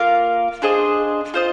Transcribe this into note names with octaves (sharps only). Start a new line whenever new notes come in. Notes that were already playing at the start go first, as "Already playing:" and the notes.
Already playing: A#3 F4 A#4 F5
D4 G#4 C5 D#5
F4 C5 D#5